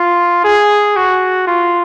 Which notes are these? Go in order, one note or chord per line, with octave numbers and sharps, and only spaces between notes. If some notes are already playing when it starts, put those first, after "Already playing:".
Already playing: F4
G#4
F#4
F4